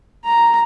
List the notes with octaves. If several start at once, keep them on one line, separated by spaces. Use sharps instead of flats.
A#5